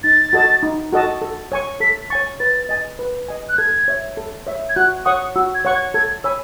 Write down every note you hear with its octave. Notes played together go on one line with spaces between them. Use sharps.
D#4 A6
F#4 A4 D#5 A5
D#4
F#4 A4 D#5 A5
A4
C#5 G#5 C#6
A4 B6
C#5 G#5 C#6 A6
B4 A6
D#5 G#5
B4
D#5 G#5
F#6
A4 G#6
C#5 E5
A4
C#5 E5
G#6
F#4 F#6
C#5 F#5 C#6 D#6
F#4 E6
G#6
C#5 F#5 C#6
G#6
A4 G#6
C#5 G#5 B5 E6